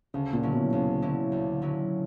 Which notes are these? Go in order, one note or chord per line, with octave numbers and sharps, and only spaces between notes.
D2 C#3
A#2
D3 F#3 C#4 E4
B2
D2 C#3
D3 F#3 C#4 E4
D2
D3 F#3 C#4 E4